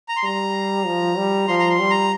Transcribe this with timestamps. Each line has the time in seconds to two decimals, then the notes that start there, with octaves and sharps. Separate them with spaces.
0.09 A#5
0.17 C6
0.23 G3 A#5
0.86 F3
1.17 G3
1.48 F3 C6
1.59 A#5
1.69 C6
1.80 G3
1.90 A#5